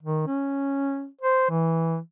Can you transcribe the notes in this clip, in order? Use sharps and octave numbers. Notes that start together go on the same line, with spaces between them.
D#3
C#4
C5
E3